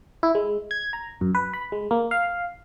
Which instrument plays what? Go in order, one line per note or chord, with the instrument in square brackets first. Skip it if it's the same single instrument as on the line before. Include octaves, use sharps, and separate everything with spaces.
[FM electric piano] E4
G#3
G#6
A#5
F#2
B4
B5
G#3
A#3
F5